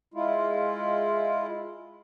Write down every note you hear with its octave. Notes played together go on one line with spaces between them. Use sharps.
G#3 E4 F4